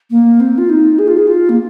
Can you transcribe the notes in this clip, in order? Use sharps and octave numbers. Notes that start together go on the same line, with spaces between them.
A#3
C4
F4
D#4
G#4
F4
G#4
F4
A#3